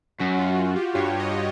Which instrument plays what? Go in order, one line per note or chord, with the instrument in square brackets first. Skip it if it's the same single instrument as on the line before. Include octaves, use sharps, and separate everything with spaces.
[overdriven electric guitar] F#2 [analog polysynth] F#4
[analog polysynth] F4
F#4
G4
[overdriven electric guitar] G2 [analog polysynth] C#5
[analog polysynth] D#5